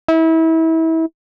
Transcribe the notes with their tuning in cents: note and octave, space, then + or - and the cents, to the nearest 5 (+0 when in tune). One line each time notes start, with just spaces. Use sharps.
E4 -30